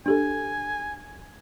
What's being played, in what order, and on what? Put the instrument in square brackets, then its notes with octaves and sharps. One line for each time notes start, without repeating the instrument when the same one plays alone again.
[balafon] D4 G4 A4 [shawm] G#5